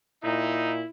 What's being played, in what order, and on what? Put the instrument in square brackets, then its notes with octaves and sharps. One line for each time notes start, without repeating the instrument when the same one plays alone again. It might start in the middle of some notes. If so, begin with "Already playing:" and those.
[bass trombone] A#2 [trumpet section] D#4 [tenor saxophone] E4